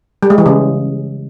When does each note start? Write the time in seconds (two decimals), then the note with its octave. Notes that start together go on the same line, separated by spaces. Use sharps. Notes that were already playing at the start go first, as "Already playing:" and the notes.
0.23 G3
0.30 G#3
0.38 E3
0.46 C#3